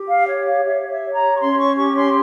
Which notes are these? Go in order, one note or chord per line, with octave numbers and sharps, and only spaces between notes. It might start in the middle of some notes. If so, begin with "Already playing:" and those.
Already playing: G4
F5
C#5
F5
G4 E5
C#5
E5
C#5
A#5
C#6
C#4 C6
C#6
G4 C#6
C6